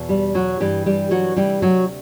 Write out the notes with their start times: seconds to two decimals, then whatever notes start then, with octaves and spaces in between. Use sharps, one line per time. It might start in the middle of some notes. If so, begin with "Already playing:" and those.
Already playing: E2 B2
0.09 G3
0.34 F#3 F#4
0.60 G2 E3 G3 G4
0.86 G3 G4
1.11 F#3 F#4
1.36 D2 C3 E3 G3 G4
1.62 F#3 F#4